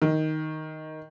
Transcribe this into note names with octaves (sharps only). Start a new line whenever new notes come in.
D#3